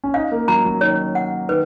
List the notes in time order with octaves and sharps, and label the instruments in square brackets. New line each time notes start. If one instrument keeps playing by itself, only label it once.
[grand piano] C#4
[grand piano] D#4 [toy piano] F5
[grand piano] A#3
[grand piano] F#3 [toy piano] A#5
[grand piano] F#3
[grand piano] D#3 [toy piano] C#5
[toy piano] F#5
[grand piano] D#3 [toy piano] B4